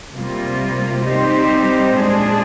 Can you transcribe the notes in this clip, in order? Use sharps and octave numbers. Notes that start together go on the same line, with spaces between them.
C3 G3 A#3 F4
G3 C4 D#4 G4 C5
A#2 G#3 D4 G#4 C5